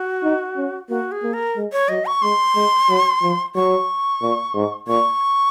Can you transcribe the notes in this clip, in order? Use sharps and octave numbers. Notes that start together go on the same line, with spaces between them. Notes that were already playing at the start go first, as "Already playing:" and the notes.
Already playing: F#4
D#4
C#4
A#3 F#4
G#4
A#3
A#4
G#3
C#5
F#3 D#5
C#6
G#3 C6
G#3
F#3
F3
F#3 C#6
A#2
G#2
A#2 C#6